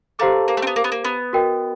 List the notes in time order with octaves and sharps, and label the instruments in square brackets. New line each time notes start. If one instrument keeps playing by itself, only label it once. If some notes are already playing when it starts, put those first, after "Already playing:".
[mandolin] A3 [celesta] G4 C5 F5 A#5 D6
[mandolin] A#3
A3
C4
B3
A#3
B3
A#3
B3
[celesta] F#4 A#4 D#5 G5